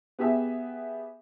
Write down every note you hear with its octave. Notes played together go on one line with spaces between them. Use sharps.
B3 G4 G#4 E5